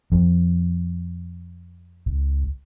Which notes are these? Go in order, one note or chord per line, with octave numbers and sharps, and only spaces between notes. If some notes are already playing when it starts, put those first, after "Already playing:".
F2
C#2